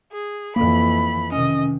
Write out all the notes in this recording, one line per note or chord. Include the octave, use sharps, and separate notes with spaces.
G#4
F2 E3 A#3 B5
C3 D#3 C#4 D#5